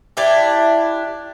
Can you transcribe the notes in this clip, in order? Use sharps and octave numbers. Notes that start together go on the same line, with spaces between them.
D4 E4 G4